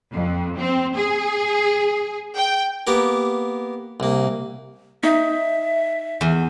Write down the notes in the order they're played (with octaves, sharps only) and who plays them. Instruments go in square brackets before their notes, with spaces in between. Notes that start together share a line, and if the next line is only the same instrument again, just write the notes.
[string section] F2
C4
G#4
G5
[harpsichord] A#3 B3 G4 A#4
C2 A#3
[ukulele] D#4 [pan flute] E5
[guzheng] E2